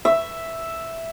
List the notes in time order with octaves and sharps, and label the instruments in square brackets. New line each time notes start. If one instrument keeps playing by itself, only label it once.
[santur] E5